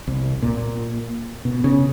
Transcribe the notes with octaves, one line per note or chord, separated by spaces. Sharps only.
C2
A#2
B2
C#3